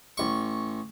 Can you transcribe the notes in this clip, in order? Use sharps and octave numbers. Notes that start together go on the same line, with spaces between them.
A1 C#6